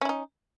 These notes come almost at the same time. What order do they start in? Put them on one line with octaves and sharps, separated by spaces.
C#4 E4 D#4